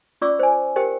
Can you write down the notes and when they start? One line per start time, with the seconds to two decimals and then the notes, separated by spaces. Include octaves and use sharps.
0.22 C#4 F4 D5 C#6 D6 E6
0.39 C5 G#5
0.76 G4 A#4 C5 G5